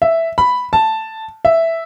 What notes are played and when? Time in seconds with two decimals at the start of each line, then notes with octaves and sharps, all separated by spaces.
0.02 E5
0.38 B5
0.73 A5
1.45 E5